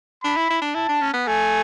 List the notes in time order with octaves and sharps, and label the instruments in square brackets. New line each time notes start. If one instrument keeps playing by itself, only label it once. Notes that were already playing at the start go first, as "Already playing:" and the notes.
[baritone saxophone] D4 [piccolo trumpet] B5
[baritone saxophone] E4
E4
D4
[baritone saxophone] E4 [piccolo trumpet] A5
[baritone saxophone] D4
C#4
B3
[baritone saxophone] A3 [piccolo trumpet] G#5